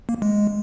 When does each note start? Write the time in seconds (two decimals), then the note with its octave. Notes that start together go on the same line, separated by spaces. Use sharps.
0.09 A#3
0.22 G#3